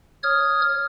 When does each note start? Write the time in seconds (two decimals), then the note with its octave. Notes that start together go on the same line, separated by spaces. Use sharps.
0.23 C#5 D#6 F6 G#6